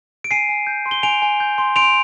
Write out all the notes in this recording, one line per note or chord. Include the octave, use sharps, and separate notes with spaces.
D7
G#5 C7 D#7
G#5
G6
C6
G7
G#5 D7 F7
G#5
G6
C6
C6 D7 F7